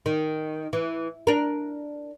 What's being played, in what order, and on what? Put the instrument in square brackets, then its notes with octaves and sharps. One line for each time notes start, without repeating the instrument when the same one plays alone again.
[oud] D#3
E3
D4 A#4